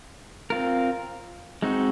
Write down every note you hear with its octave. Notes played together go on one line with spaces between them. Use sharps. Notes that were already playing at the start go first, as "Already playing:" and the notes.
C4 F4 A#4
G#3 C4 D#4 F#4